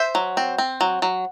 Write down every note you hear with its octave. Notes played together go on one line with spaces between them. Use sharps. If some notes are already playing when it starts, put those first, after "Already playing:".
Already playing: C5 E5
F#3
C4
C4
F#3
F#3